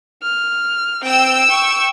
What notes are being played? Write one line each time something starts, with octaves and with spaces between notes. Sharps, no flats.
F6
C4 G5 E6
C#6